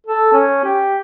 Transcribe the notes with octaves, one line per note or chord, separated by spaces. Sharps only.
A4
C#4
G4